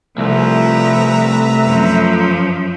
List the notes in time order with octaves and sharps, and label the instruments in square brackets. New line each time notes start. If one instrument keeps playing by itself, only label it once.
[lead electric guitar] C2 [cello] F3 [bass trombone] A3 [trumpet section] B4 E5 A#5
[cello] F#2 F3